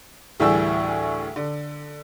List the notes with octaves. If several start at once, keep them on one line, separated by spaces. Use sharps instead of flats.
D2 A2 E3 G3 G#4 E6
D3